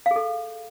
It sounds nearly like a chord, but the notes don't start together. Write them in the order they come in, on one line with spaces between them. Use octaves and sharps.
F5 G#4 A4